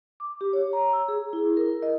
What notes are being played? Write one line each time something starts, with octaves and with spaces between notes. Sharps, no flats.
D6
G4
C#5
A#5
E6
G#4
E4
A#4
D#5